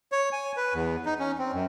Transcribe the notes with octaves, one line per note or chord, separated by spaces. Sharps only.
C#5
G#5
B4
E2
D#4
C#4
C4
F#2